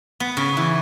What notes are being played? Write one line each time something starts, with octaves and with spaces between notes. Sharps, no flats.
B3
C#3
E3